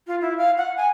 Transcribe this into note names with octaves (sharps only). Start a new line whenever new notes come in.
F4
E4
F5
F#5
G#5